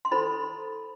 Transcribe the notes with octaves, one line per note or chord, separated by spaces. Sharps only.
C6
E4 A4 C5 B5